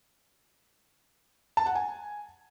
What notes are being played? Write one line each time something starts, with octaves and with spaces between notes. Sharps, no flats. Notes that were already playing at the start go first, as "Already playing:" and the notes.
A5
F#5
G#5